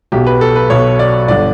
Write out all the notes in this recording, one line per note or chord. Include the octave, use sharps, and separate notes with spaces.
B1 B2 G4
B4
A4
B4
B1 B2 C#5
D5
G1 D3 D5